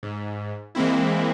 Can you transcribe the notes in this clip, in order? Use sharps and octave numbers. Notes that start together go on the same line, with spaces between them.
G#2
E3 G#3 A#3 C4 E4